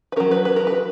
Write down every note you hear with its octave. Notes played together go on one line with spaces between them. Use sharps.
B4
F#3 C#4 A#4
B4
B4
A#4
B4